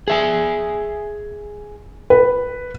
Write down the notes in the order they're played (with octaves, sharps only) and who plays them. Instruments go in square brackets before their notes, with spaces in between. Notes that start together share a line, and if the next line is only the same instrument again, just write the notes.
[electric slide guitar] G#4 E5 G#5
[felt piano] B4